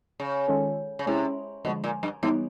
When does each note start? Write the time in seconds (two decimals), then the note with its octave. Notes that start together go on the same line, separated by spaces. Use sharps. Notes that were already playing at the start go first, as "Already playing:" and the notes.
0.20 C#3
0.48 D#3 G#3 C#4 F4 A4
0.99 C#3
1.07 C3 G#3 C#4 E4 G#4
1.65 B2 D3 F3 G#3
1.84 A#2
2.03 G2
2.23 G#2 E3 G3 B3 D#4